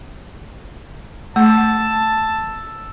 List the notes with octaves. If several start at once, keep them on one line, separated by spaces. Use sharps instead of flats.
A3 A5 E6